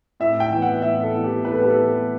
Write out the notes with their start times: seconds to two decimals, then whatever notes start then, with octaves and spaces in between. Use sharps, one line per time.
0.20 A2 E5
0.40 G5
0.51 E3 B3
0.62 F#5
0.82 A2 E5
1.03 A4
1.14 E3 B3
1.23 G4
1.44 A2 B4
1.52 A4
1.62 G4
1.69 A4
1.76 E3 B3